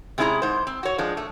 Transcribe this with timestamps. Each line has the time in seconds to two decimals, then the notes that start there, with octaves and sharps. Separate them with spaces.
0.18 C3 G#3 C#4 E4 G#4 A#5
0.42 G#2 C5
0.67 C4
0.83 F#4 C#5
0.98 F3 G#3 D4
1.17 A3